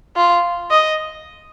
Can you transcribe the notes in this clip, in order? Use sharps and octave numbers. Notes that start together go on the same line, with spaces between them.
F4
D#5